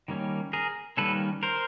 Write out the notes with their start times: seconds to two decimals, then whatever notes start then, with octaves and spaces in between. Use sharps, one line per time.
0.08 D#3 G3 A#3 C#4
0.53 G#4 A#4
0.97 D#3 G3 A#3 C#4 A4 B4
1.43 A#4 C5